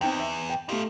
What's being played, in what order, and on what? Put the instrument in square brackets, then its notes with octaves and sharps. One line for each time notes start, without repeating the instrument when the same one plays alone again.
[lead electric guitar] E2 [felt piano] C4 D#4 G5
[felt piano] E5
G5
[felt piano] A3 G4 [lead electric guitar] D#4 F4